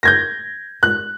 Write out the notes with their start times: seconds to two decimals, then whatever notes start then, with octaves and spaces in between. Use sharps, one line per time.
0.03 G6 G#6 A#6
0.83 F#6